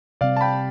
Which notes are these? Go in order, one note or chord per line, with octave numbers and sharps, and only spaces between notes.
C3 G3 C4 D5 F5
A5
G5 B5